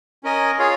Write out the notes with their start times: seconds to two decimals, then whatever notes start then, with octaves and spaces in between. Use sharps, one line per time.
0.24 C#4 A#4 D#5 G#5
0.58 F4 G#4 C#5 F5